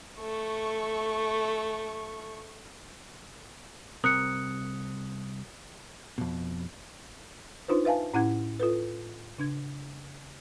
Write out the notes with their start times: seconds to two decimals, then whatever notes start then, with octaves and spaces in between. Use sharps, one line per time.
0.20 A3 C#6
4.04 C2 C4 A#4 D#6 F#6 C#7
6.18 F2 B2
7.68 D4 D#4 F4 B4 C5
7.85 B4 E5 F5 G#5 A5
8.14 A2 C#4 E4 F#5 F#6 G#6
8.60 F4 A4 B4
9.38 C#3 D4 G#6